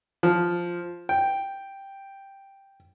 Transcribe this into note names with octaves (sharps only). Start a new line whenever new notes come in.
F3
G5